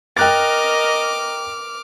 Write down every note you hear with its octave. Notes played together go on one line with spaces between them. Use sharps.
A#4 D#5 G5 D6 F6 F#6 A6